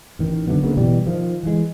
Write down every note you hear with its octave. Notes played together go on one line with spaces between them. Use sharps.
A1 D#3
D3 F#3 A3 B3
D2 C#3 A#3 B3
B2 E3 G3
D#3 F3
E3 G#3